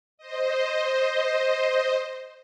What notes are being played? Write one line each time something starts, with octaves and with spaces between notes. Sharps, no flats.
C5 D#5